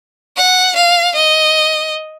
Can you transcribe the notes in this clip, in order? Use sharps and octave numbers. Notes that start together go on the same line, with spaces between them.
F#5
F5
D#5